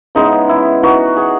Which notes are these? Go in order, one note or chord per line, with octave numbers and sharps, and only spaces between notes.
C#3 E3 G#3 B3 D#4
E4
E3 B3 D#4 F#4
G#4